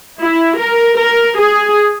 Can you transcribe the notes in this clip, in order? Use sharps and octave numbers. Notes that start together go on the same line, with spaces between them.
E4
A#4
A#4
G#4